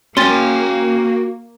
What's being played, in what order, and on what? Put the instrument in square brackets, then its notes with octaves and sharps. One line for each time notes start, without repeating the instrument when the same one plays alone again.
[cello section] A#3 [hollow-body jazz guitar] C#4 [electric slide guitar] F#4 G5 [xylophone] C6 A6